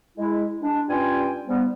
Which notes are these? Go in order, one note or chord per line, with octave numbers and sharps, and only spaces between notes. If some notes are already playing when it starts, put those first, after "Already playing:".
G#3 E4
G#3 D4
G2 G3 C#4 F4 G5 G#5
G#2 G3 B3